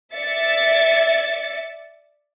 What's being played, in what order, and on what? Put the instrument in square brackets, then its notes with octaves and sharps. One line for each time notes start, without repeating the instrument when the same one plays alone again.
[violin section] D5 E5 A6 C#7